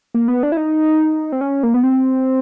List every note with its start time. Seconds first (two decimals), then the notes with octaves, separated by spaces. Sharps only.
0.14 A#3
0.28 B3
0.43 D4
0.52 E4
0.57 D#4
1.32 C4
1.41 C#4
1.63 A#3
1.74 B3
1.83 C4